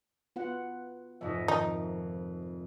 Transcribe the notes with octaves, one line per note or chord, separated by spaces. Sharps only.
B3 F4 F#5
F1 F2 G#2 D#5 E5
F2 D#3 D#4